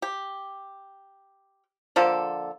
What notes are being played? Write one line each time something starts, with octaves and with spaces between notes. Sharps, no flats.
G4
D3 F3 A#3 A4